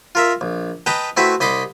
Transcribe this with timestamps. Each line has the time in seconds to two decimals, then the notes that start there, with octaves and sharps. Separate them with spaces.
0.15 F4 A#4 E5
0.41 A#1
0.86 B4 D#5 G5 A5 A#5
1.17 A3 C4 E4 F#4 B4 E5
1.40 C2 D#5 B5 C6 D6